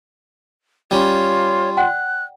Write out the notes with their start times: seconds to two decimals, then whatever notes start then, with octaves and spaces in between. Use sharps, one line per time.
0.91 G3 C#4 F4 C#5
1.77 D5 F#5 G5 F#6